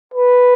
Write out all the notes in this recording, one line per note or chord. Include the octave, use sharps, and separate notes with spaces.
B4